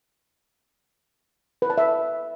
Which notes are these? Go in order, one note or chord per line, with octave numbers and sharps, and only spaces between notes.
B4
A5
E5